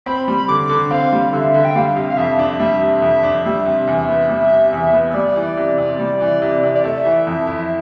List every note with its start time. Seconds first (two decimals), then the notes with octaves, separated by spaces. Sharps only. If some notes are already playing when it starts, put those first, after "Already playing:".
0.06 C4 B5
0.28 G3
0.48 D3 D6
0.69 D3
0.91 C4 F5
1.13 G3
1.33 D3 E5
1.54 D3
1.65 G5
1.76 G3 F5
1.96 C3
2.10 F5
2.17 F2 E5
2.39 D4
2.60 G3 E5
2.81 C3
3.02 F2
3.23 D4
3.45 G3 E5
3.66 C3
3.87 E2
4.09 B3
4.29 G3
4.51 C3
4.73 E2
4.93 B3
5.10 E5
5.14 G3 D5
5.36 E3
5.57 C3
5.78 C3
5.99 G3
6.20 E3
6.42 C3
6.63 C3
6.75 D5
6.84 A3 E5
7.05 E3
7.27 F2
7.47 E4